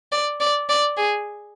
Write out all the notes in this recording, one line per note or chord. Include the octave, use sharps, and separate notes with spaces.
D5
D5
D5
G#4